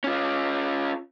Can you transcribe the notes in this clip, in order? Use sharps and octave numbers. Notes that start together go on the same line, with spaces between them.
C#4 F4